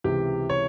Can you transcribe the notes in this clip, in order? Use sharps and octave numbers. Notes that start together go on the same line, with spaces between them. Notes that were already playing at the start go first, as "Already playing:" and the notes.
C#2 C3 E3 G4
C#5